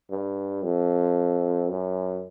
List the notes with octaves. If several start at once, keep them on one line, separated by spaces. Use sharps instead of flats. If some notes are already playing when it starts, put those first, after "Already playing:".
G2
F2
F#2